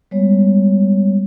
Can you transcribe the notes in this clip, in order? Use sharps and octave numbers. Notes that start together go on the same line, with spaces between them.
G3 G#3 B3 C#5